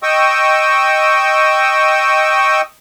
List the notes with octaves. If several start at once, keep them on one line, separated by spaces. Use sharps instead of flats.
D#5 G5 C#6 D#6 E6